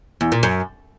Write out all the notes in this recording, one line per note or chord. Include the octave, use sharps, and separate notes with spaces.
E2
A#2
F#2